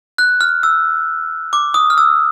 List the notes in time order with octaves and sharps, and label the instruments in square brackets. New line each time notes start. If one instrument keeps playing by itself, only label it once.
[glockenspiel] F#6
F6
E6
D6
D#6
F6
E6